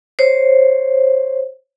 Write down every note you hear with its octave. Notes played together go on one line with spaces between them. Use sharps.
C5 C#5